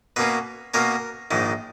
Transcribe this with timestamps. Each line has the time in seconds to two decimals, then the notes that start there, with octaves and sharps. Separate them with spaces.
0.16 B2 A#3 C#4 B4
0.74 B2 A#3 C#4 A#4
1.31 A#1 G#2 D#3